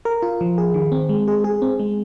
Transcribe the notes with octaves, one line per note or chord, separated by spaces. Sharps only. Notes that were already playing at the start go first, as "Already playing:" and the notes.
A#4
F4
F3
G#4
D#3
C4
G#3
G#4
G#4
C4
G#3